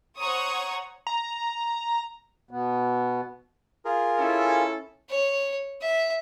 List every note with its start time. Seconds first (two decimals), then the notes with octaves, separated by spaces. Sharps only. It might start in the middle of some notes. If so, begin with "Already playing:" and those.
0.20 C5 C#5 F#5 A#5 C#6 D#6
1.07 A#5
2.51 B2 B3
3.85 F4 G#4 A#4
4.19 C#4 E4 A4
5.10 C#5
5.81 E5